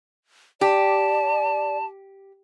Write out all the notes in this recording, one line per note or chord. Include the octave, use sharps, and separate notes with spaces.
G4 D5 A5